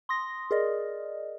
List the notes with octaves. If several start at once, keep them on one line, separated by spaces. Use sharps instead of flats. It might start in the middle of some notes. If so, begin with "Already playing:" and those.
C6 D#6 A#6
G#4 A#4 D5 D#5